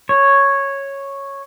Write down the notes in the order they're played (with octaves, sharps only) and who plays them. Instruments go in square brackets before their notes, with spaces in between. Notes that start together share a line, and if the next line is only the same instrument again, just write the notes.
[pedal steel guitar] C#5